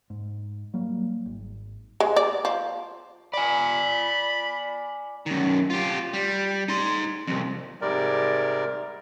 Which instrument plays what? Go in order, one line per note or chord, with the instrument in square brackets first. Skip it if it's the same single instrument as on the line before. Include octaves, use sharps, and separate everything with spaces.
[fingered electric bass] G#2
F#3 G3 A#3
G#1
[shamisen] G#3
D5
F3
[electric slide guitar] D5 G#5 [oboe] B5
[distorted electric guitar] F#2 D#3
F4 G4
G3
D#4 C6
C2 F2
[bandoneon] G#2 C3 G3 A#4 D5